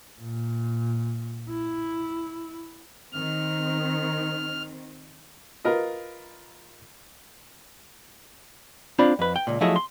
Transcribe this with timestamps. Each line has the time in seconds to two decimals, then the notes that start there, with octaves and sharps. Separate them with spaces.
0.20 A#2
1.50 E4
3.12 D#3 C4 F6
5.65 F4 A#4 B4 D#5
8.99 C4 D4 F4 B5
9.19 F2 B4
9.36 G5
9.47 C#2 A#2
9.61 F3 F#3 A3 E4 G#4 D#5
9.76 C6